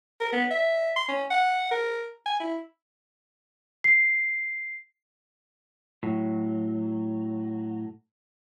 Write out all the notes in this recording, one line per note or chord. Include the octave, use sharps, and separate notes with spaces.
A#4
B3
E5
C6
C#4
F#5
A#4
G#5
E4
C7
A2 F#3